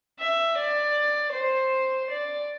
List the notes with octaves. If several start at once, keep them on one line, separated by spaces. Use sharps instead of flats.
E5
D5
C5
D5